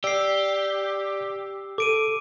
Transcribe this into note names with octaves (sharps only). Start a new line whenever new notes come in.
G4 D5 E6 C7
A4 D6 D7 D#7